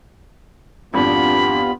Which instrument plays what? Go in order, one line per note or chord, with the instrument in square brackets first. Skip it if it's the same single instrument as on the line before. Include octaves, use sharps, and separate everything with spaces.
[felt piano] G#1 F2 [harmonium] G3 B3 F4 [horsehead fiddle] D4 [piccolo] B5